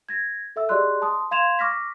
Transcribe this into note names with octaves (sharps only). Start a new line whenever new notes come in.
G#6 A#6
A4 E5 E6
G4 G#4 D5 D#5 C6 F#6
A5 C6 D#6
F5 C6 G#6 E7 F7
C#6 D6 F6 A#6 B6